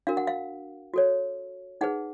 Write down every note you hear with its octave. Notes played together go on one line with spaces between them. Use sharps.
D4 F#4 A#4 F5
F#5
F5
F#4 A4 C#5
D#4 G#4 B4 F#5